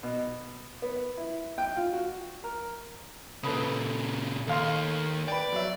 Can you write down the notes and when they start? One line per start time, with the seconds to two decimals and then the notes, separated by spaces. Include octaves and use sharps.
0.03 B2
0.82 B3
1.17 E4
1.58 G5
1.77 F4
1.93 F#4
2.44 A#4
3.43 A#2 C#3 A4 B4 D#6
4.47 D#2 A3 F5 C6
5.28 B4 D5 G5
5.52 F#3 E5